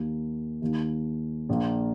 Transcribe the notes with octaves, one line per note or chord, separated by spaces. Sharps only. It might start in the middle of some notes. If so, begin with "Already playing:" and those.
Already playing: D#2 D#3 A#3
D#2 D#3 A#3
A#1 A#2 A#3